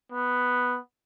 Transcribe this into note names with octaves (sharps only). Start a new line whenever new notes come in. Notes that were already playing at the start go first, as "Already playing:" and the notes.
B3